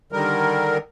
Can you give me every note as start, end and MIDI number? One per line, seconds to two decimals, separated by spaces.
0.12 0.78 50
0.12 0.78 51
0.12 0.78 55
0.12 0.78 70